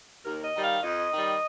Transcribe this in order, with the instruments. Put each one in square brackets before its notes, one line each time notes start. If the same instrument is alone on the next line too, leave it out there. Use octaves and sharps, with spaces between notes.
[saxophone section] D#2 A#4
D#5
D#3 G3
F5
F2 D#5
D#3
G3